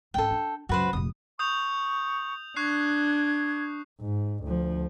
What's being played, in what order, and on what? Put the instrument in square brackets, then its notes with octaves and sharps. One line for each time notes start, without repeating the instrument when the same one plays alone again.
[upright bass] G#2 C#4 [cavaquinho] A4 G5
[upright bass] D4
[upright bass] C#2 F#2 [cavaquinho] F#4 B4 C5
[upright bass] F1 A#1 [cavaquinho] D#6
[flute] C#6 [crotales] D#6 G6 F7
[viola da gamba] D4 [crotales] C#6 F#6 C7 [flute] G#6
[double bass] G#2
D2 F3